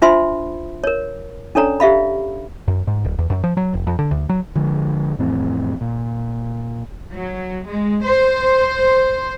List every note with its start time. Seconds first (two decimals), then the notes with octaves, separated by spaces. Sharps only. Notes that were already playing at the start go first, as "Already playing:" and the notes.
0.02 D4 F4 C5 E5 B5 C6
0.84 A#4 C#5
1.55 C#4 D4 A4 C#5 D5 A#5
1.80 G4 E5 F5 B5
2.68 F#2
2.87 G#2
3.05 D1
3.18 E2
3.30 F#2
3.44 F3
3.57 F#3
3.74 F1
3.87 F2
3.99 D3
4.11 D2
4.29 F#3
4.56 D3 F3 G#3
5.19 F2 A2 E3 C4
5.81 A#2
7.12 F#3
7.66 G#3
8.03 C5